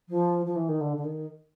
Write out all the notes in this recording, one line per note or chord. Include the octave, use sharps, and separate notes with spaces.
F3
F3
E3
D#3
D3
D3
D#3